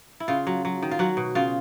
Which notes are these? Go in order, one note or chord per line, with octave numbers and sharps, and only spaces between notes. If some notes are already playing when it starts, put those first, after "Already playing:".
E4
C#3 F4
F#3
F#3
D#3
F4
F#3 F#4
B2
C#3 F4